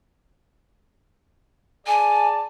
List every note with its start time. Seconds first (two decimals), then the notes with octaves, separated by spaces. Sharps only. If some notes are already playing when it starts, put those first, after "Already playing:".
1.87 G#4 D5 G#5 A5